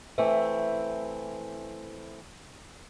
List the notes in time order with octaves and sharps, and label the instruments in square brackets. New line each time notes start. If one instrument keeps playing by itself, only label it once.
[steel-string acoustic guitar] E3 A3 C4